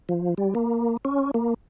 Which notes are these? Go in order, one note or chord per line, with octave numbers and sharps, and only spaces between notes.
F3
G3
A#3
C#4
A#3